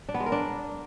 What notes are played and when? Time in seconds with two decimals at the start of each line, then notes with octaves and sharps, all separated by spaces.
0.09 D4
0.14 B3
0.20 G#3
0.26 A#4
0.32 D4